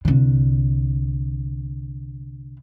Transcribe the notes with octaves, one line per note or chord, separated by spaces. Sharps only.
C2 D3